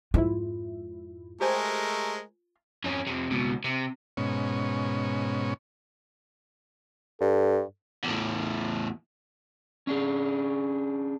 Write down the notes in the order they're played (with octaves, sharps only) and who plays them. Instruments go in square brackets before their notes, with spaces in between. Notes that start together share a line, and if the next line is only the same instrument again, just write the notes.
[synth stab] F2 G#2 E4 [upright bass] F4
[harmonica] G#3 A3 A#4 [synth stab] G4 C5 G#5
[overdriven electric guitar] F2 C#4
F2 C3
C#2 B2
C3
[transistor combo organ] G#2 B2 C#4
[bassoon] G2 [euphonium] A4
[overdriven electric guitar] E2 A2
[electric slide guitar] C#4 D4 G#4